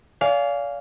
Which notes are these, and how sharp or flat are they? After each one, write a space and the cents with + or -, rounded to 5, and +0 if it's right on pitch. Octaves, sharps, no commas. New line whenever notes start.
D5 -40 F5 +0 G#5 +0